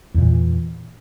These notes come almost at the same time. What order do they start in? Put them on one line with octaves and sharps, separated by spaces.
E2 A#2 E3